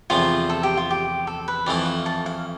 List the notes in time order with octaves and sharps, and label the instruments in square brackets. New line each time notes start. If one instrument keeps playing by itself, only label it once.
[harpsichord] E2 C3 F3 A3 [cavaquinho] F4
[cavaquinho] A4
G4
F4
G4
A4
B4
[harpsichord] F2 E3 A3 E4 [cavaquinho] D5
[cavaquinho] F5
A5
F5